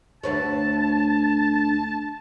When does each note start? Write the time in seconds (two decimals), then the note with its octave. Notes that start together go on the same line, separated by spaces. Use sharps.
0.23 D2 B4 C#5 A5